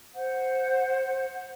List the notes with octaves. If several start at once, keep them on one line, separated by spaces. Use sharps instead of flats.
C5 F#5 G6